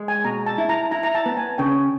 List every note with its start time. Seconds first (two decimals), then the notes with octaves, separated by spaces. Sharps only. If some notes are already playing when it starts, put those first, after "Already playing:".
Already playing: G#3
0.08 G#5
0.24 B2 A#5
0.46 A5
0.58 E4
0.69 A#5
0.91 E4 A#5
1.03 A#5
1.15 A5
1.26 B3
1.37 G#5
1.58 C#3 G5